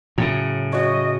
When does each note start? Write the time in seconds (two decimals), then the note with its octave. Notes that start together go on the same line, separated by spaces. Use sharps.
0.18 A2 C#3 F#3
0.72 F#4 C#5 D#5